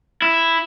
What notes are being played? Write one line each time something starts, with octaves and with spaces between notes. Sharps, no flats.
E4